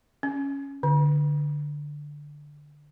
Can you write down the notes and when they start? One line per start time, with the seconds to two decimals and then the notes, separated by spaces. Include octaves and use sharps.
0.23 C#4
0.83 D3